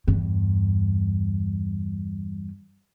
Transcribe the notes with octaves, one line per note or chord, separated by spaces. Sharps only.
E2 G2